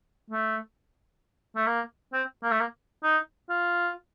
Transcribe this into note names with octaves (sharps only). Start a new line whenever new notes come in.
A3
A3
A#3
C4
A#3
A3
A#3
D#4
F4